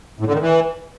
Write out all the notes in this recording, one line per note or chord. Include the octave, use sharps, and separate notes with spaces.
A2
D3
D#3
E3